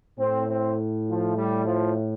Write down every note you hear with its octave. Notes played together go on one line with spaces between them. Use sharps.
A2 C4
C4
F3
G3
F3